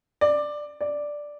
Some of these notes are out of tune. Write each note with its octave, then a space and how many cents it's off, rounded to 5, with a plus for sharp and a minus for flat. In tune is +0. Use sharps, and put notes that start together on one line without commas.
D5 +10
D5 +0